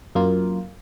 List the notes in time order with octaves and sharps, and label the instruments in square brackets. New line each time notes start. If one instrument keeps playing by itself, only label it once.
[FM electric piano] F#2 A#3 F4